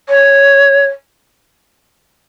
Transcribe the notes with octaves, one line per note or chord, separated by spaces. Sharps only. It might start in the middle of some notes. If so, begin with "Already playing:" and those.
C#5